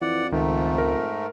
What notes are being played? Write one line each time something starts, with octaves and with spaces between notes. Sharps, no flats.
F2 E3 D5 F#5
C#2 G#2 D#3 A3
A#4